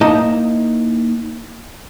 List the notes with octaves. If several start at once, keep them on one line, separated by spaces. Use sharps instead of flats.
A#3 D#4 E4 D#5 A5 A#5